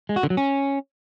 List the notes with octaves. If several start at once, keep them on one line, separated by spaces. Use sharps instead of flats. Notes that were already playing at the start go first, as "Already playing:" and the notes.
G#3
F#4
D3
F#3
C#4